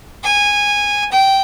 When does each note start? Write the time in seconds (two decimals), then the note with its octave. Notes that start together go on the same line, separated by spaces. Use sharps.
0.24 G#5
1.12 G5